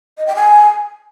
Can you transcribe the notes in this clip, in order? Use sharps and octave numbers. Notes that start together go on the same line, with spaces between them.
D#5
G5
G#5